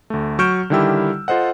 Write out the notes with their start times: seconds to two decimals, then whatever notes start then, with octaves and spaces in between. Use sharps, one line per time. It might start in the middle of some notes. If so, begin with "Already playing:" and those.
0.10 D2 A3
0.39 F#3 C#6 F6 G6 D7 E7
0.70 D3 D#3 G3 E4 G4 E6
1.28 F4 A4 C5 D#5 F#5